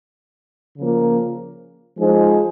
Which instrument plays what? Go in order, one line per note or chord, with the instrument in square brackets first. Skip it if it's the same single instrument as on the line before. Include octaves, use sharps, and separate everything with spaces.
[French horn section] C#3 F3 A#3
F3 G#3 D#4 G#4 C5